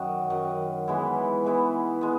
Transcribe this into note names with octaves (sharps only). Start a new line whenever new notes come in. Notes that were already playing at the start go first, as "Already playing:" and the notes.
Already playing: F#2 D#3 F#3
F#2 D#3 F#3
E3 G#3 B3 E4
E3 G#3 B3 E4
G#3 B3